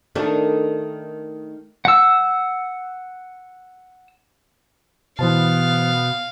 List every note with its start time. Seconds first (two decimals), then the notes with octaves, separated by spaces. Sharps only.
0.15 D#3 A3 D4
1.85 F#5 E6
5.19 B2 E3 B3 C5 F5 A5